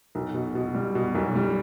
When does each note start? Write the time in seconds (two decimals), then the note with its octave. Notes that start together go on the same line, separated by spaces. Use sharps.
0.15 B1
0.34 B2
0.55 B2
0.75 G3
0.95 B2
1.15 B1
1.36 G3